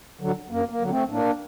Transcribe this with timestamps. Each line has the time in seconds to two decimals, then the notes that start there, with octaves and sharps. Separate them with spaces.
0.21 D3 F#3
0.50 F#2 A#3
0.69 A#3
0.80 D3 F#3
0.90 A3 C4
1.09 A2 A#3 D4